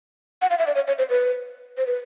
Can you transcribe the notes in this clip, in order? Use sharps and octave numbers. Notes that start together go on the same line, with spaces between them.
F#5
F5
E5
D5
C#5
C#5
C5
B4
C5
B4